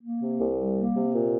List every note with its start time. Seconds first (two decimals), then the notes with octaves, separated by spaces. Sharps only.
0.02 A#3
0.21 C3
0.39 C2
0.58 G3
0.77 A#3
0.95 C3
1.14 A#2